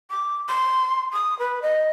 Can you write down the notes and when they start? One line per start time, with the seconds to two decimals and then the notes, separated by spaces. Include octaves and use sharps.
0.10 D6
0.49 C6
1.13 D#6
1.39 B4
1.62 D#5